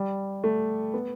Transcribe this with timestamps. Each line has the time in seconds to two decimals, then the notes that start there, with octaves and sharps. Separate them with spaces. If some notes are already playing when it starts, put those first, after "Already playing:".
Already playing: G3
0.44 A3
0.94 B3